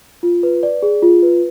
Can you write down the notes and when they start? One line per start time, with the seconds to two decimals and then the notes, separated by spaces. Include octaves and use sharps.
0.23 F4
0.43 B4
0.63 D5
0.82 G#4
1.02 F4
1.23 B4